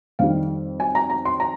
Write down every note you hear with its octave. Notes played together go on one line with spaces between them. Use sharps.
F2 D#3 G3 F5
G#5
A#5
A#5
C6
A#5